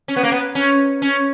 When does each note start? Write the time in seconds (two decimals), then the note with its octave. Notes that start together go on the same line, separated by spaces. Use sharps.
0.08 C#4
0.16 B3
0.23 A#3
0.32 B3
0.55 C#4
1.02 C#4